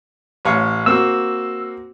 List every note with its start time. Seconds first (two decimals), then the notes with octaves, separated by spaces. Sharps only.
0.45 A1 C#5 F5
0.86 A#3 C4 F#4 E6